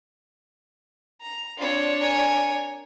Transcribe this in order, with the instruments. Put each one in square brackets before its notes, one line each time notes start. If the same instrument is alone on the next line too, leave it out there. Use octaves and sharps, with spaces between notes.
[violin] A#5
[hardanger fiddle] C4 F4 [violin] D4 C#5
[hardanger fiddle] A#4 G#5